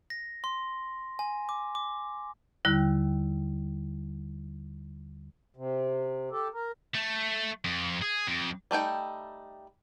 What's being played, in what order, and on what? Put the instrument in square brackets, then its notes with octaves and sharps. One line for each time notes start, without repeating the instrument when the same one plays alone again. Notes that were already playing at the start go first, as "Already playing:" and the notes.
[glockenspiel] A#6
C6
G#5
D6
D6
[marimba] D#2 D3 G3 E4
[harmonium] C3
G4 A4
A#4
[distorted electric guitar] A3
F2
G#4
F2
[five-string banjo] G3 A3 D#4 G5